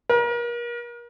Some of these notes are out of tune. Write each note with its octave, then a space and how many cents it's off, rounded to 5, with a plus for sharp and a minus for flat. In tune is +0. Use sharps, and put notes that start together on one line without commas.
A#4 +35